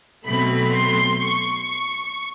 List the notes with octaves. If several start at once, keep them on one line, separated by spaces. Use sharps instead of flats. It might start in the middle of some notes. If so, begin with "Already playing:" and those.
B2 F#3 A3 C4 B5
C6
C#6